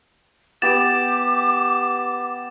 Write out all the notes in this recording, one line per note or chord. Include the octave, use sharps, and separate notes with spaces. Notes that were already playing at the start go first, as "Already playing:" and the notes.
B3 G4 D6 A6 E7